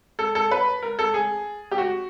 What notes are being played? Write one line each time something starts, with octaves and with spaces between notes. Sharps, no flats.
A4
A4
B4
A#4
A4
G#4
G4
F#4